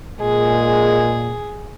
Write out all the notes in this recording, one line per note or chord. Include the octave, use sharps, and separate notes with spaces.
A#2 G#3 G#4